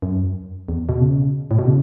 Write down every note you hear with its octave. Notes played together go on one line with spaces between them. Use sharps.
F#2
E2
B2
C#3
A2
B2
C#3